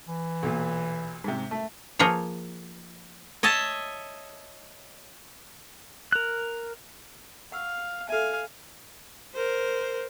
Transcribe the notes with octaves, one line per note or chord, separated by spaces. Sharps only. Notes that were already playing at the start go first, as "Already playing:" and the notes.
E3
B1 A#2
G#2 C3
A3
F3 A#3 G#4 C#5
C#5 D#5 E5 A5
A#4 F#6
F5 F#5 C#6 E6
A4 E5 F5 G#5
A#4 C5